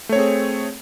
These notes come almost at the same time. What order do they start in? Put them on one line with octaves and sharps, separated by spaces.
A3 C#5 C4 G#4